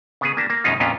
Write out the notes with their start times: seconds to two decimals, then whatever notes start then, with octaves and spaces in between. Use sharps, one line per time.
0.21 C#3 B3 G#4
0.37 A#3 D4 G4 A5
0.50 A#3
0.64 F#2 B2 G#3 C#4 D#4 F4
0.80 F2 A#2 B3 C#4 D4 F4